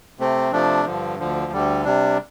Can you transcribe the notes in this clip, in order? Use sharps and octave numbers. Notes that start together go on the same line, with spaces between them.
C3 A3 C4
C3 F3 A3 D4
G2 D3 F3
D2 D3 F3
D2 D3 G3
C3 G3 D4